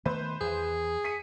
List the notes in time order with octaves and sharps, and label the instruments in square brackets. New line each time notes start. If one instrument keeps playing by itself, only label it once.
[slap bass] D#3 A3 B3 [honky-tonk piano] B4 C5
[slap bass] E2 [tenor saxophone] G#4
[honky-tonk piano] B6 C#7 D#7